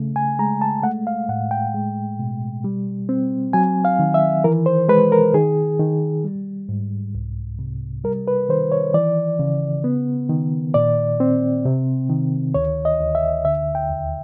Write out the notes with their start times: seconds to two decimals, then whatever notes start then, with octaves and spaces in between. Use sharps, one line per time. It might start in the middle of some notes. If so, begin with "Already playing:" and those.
Already playing: C#3 A3
0.16 G#5
0.39 G#3 A#5
0.62 A5
0.83 A3 F#5
1.07 F5
1.29 A2 F#5
1.51 G5
1.74 G#3
2.19 B2
2.64 G3
3.09 C4
3.53 F#3 G#5
3.85 F5
3.99 D#3
4.14 E5
4.44 E3 A#4
4.66 C5
4.89 G#3 B4
5.12 A#4
5.34 D#3 G#4
5.80 D#3
6.24 G3
6.69 G#2
7.15 C2
7.59 C3
8.04 G3 A#4
8.28 B4
8.49 D#3 C5
8.72 C#5
8.94 E3 D5
9.39 C#3
9.84 B3
10.29 D#3
10.74 A#2 D5
11.20 C4
11.65 C3
12.09 D#3
12.54 D2 C#5
12.85 D#5
13.00 D2
13.15 E5
13.45 D3 E5
13.75 G5
13.90 D#2